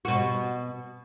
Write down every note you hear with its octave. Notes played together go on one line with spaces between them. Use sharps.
B2 F#4